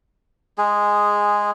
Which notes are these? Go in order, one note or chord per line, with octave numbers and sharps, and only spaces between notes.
G#3 G#4